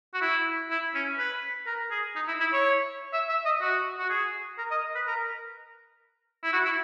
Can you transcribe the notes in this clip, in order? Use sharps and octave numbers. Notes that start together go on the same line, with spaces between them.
F#4
E4
E4
C#4
B4
A#4
G#4
D#4
E4
E4
C#5
E5
E5
D#5
F#4
F#4
G#4
A#4
D#5
B4
A#4
E4
F#4
E4